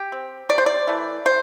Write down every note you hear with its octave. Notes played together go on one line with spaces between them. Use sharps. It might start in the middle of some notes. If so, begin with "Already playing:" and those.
Already playing: G4
C4
C3 D5
C5
D5
E3 A3
C3 C5